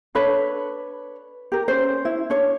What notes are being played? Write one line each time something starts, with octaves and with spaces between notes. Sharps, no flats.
D4 A4 B4 C#5
G4 A#4
C#4 C5
E4
D4 C#5